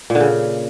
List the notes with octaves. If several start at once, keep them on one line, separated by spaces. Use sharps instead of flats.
A#2
D3
C#3